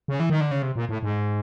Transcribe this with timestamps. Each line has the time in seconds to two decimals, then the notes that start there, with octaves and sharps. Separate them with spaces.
0.08 C#3
0.20 E3
0.30 D#3
0.41 D3
0.51 C#3
0.62 C3
0.76 A#2
0.89 A2
1.03 G#2